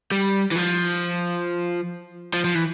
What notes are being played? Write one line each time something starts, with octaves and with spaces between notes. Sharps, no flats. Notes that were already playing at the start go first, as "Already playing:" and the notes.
G3
E3
F3
F3
F3
E3